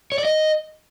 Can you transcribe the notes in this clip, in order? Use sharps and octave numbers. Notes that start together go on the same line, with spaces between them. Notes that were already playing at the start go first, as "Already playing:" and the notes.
C#5
D5
D#5